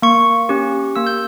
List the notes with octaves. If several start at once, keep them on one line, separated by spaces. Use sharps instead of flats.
A#3 C#6
C#4 G4
A#3 E6
G6